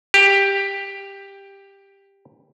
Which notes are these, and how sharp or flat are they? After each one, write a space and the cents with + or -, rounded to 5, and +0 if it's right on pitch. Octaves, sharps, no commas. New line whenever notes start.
G4 +10